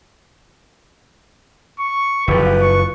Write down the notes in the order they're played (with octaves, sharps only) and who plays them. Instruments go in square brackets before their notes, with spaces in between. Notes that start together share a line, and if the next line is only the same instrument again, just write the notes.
[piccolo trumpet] C#6
[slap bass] F#1 F3 [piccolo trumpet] G4 [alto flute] B4
[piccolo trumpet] C#6